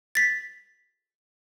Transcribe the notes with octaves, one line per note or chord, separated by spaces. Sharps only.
A6 B6